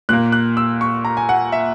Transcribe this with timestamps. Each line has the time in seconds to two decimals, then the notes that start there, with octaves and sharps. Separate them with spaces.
0.09 A#2 F#6
0.13 A#3
0.32 F#6
0.57 E6
0.81 C#6
1.05 A#5
1.17 G#5
1.29 F#5
1.52 E5